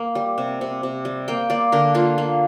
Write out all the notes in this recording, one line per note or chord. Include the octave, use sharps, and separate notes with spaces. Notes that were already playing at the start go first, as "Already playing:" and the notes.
Already playing: A#3 F5
G3
C3
C3
C3
G3
A#3 G5
A#3 D5
D3 A#4
A#3 F4
A#3